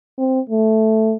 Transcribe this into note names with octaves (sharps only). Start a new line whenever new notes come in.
C4
A3